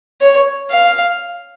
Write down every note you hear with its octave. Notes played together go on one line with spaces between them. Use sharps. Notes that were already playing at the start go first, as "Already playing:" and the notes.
C#5
F5